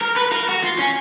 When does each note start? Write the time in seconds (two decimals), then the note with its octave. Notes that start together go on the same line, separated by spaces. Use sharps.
0.02 A#4
0.17 B4
0.32 A#4
0.49 F#4
0.64 F4
0.79 C#4